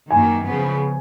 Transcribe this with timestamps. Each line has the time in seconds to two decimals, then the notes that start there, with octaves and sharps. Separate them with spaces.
0.10 F#2 D#3 A#3 G#5
0.43 C#3 F3 B3